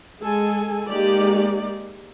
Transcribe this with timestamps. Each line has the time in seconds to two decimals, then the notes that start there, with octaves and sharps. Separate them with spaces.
0.21 G#3 G#4 A4 G#5
0.88 G#3 A#3 D#4 G4 D5